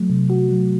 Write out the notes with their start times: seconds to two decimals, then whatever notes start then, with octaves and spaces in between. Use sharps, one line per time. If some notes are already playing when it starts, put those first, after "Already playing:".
Already playing: F#3 A3
0.10 C3
0.30 F#4
0.49 F#3